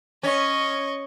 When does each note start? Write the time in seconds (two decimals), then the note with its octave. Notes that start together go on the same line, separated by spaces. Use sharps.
0.23 C#4 D#5 C#6